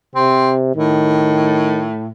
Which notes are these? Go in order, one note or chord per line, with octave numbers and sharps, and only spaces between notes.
C3 C4
A2 D#3